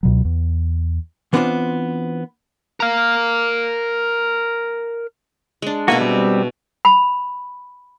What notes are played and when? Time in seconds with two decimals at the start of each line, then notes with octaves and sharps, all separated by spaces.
0.03 C#2 B2 F#3
0.25 E2
1.33 E3 B3 C4 D4 F4 C5
2.80 A#4 F5
5.62 G#3 D4
5.88 B2 A#3 F#4 E5 G#5
6.01 G3 C4
6.85 B5